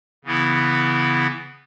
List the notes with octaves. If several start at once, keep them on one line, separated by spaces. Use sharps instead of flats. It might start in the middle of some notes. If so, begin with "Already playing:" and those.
C#3 E3 B3 E4